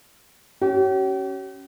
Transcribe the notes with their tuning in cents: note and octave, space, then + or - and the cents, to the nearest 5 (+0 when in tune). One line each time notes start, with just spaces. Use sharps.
C#4 +0 G4 -45